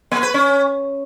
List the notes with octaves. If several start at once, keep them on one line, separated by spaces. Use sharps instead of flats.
A#3
B4
C#4